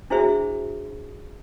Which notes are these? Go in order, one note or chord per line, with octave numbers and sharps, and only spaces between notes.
D4 E4 F#4 G#4 C5 E5